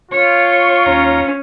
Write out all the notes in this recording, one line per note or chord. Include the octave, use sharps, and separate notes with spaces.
F4 C#5
D#2 C#4 A#5